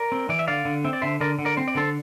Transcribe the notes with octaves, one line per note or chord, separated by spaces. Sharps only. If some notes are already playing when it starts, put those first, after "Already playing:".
Already playing: A#4 D5
C4
E3 D5
E5
D3 D5 F5
D3
C4 E5
D5
D3 C5 E5
D3 A#4 D5
D3
A#4 D5
C4 C5
D5
D3 A4 C5